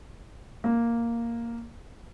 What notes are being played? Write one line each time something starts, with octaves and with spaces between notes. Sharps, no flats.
A#3